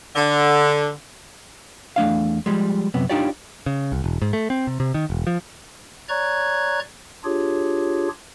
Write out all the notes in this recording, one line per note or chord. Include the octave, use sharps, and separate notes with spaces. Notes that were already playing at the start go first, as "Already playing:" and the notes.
D3
E2 A3 D4 F5
F3 G3 G#3
F#2 C3 B3
D4 D#4 F4 G4 C#5 D5
C#3
C2
E1
G#2
A3
C4
C3
C3
D#3
E1
F3
C#5 D5 A#5 C#6 F#6 G#6
D4 F4 G4 G#4 C#5